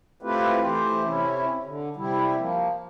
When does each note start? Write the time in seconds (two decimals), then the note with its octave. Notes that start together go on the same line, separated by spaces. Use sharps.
0.23 A3 C4 E4 F4 G4 B4
0.62 E3 A3 G4 C5
1.03 C3 C#4 E4
1.66 D3
1.96 C3 G3 E4
2.37 F3 A#3